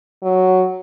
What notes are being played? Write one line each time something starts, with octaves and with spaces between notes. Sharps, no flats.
F#3